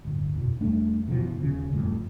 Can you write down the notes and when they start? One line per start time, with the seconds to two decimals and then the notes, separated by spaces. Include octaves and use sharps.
0.05 D1 G1
0.36 F2 B2
0.60 E2 G3 A3 D4
1.07 F#1 B2 E3 F3
1.41 D#1 C#3
1.72 F#1 F2 A2 G3